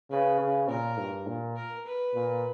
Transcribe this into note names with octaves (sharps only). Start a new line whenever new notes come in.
C#3 B4
C#3
A#2 A#4
G2
A#2
A#4
B4
A#2